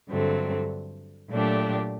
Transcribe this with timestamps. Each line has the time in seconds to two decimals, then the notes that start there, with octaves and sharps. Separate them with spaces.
0.10 G2 D3 F#3 A3 C4
1.31 A#2 F#3 A3 D4 G4